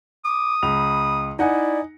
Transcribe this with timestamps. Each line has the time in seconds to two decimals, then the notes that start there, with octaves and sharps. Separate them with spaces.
0.25 D6 D#6
0.63 C#2 B5 F7
1.39 D#4 E4 D5 F#5 G#5